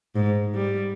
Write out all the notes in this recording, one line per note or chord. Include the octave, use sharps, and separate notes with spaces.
G#2
G3